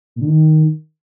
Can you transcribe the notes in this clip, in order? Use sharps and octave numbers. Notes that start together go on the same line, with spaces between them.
A#2
D3
D#3